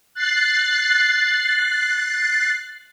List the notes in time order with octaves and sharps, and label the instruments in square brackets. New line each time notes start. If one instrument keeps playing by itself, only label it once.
[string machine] F#6 A6 C7